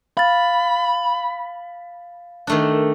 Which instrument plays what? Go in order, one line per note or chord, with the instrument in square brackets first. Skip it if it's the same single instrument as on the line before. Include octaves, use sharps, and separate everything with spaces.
[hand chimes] F5 A6 [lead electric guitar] B5
[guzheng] D#3 A3 D4